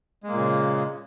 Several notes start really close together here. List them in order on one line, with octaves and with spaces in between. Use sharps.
G#3 A#3 A#2 C#3